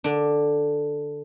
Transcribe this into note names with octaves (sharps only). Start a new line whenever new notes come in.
D3 D4